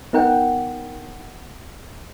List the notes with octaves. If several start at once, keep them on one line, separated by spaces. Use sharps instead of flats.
B3 D#4 A#4 F#5 G5